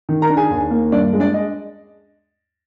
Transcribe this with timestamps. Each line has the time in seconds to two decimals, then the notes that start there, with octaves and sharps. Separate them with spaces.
0.09 D#3
0.22 A#4 A#5
0.30 D4
0.37 G#4 G#5
0.50 D#2
0.71 A#3
0.92 G2 D4 D5
1.13 G#3
1.20 D4 D5
1.34 D#5